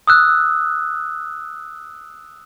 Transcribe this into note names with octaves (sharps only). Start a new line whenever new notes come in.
D#6 E6 F#6